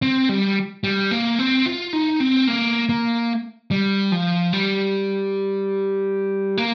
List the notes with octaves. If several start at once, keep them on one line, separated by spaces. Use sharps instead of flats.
C4
G3
G3
A#3
C4
F4
D#4
C4
A#3
A#3
G3
F3
G3
A#3